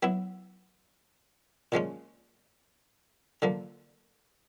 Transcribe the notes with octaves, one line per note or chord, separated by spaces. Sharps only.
F#3 B3 E4
A#2 F3 G#3 C#4
D3 F3 A#3